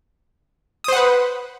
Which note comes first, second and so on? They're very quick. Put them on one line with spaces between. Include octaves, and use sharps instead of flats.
D#6 C5 F#5 B4